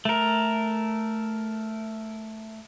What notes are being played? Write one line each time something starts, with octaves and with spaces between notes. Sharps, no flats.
A3 A#4